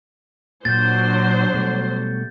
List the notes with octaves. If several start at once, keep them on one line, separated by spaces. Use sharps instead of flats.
A#2 F#3 D4 C5 G6 A6
B2 G3 A3